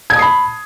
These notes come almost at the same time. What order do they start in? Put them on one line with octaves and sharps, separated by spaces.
G#6 A5 D#6 C7 B5